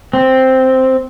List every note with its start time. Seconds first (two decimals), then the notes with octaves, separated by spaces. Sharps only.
0.13 C4